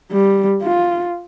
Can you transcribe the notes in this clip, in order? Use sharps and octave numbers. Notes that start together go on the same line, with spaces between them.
G3
F4